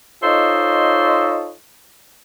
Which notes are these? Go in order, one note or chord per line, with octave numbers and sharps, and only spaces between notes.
D#4 F4 A4 C5 C#5 D#5